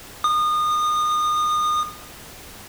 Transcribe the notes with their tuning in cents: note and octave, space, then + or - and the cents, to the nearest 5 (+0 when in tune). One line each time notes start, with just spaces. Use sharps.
D#6 -30